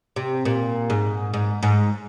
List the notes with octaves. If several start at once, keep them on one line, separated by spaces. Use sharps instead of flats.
C3
A#2
G#2
G#2
G#2